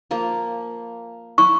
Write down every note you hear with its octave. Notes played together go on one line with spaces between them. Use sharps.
F3 A#3
E4 C#6